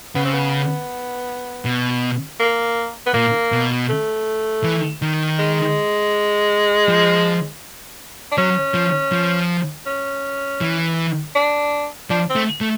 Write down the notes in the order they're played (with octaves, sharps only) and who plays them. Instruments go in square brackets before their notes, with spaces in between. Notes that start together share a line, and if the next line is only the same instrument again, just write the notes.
[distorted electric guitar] C#3 [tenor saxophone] B3
[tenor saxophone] C4
B3
[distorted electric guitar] B2
[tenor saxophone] A#3
B3
[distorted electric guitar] A#2 [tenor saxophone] A#3
[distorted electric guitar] B2
[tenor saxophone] A3
[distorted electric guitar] E3
D#3
[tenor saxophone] G#3
[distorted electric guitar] F3
[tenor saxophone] D4
[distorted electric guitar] F#3 [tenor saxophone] C#4
[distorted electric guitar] F3
F3
[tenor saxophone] C#4
[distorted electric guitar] E3
[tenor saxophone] D4
[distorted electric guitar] F3 [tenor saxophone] D4
[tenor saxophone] C4
[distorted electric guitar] A3
A3